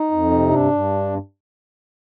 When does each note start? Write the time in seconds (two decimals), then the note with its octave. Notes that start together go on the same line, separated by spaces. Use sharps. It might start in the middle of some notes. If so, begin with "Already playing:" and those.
Already playing: D#4
0.11 F2
0.31 C3
0.51 G2 D4
0.71 G2